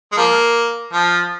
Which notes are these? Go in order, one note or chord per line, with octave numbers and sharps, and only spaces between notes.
G#3
F3 A#3
F3